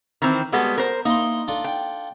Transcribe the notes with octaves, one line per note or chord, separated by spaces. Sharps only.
D#3 E3 C4
G3 G#3 B3 F#4 A4
A#4 C5
A#3 D#4 E4 C6
D4 F4 A4
G5